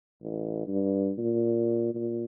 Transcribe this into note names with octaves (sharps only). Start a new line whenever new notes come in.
A1
G2
A#2
A#2